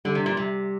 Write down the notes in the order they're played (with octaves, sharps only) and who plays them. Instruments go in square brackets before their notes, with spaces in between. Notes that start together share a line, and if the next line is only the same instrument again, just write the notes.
[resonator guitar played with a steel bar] D3 [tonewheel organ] G3
[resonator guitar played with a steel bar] C3
A#2
[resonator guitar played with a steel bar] C3 [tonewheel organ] G3